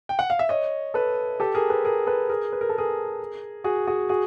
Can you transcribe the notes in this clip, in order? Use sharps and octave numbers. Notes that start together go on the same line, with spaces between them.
G5
F#5
F5
E5
C#5 D#5
A4 B4
G4 A4
G#4 A#4
A4 B4
G#4 A#4
A4 B4
G#4 A#4
B4
A#4
A4
G#4 A#4
F#4 G#4
F#4 G#4
F#4 G#4